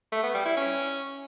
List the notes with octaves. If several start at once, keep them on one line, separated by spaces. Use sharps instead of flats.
A3
B3
G3
E4
C#4